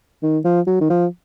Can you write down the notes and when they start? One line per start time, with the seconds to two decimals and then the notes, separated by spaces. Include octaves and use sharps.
0.23 D#3
0.45 F3
0.67 F#3
0.81 D#3
0.90 F3